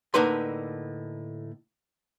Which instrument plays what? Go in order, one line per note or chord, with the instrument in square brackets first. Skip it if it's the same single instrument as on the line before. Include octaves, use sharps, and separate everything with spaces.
[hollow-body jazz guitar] A2 D3 A#3 D#4 B4 C6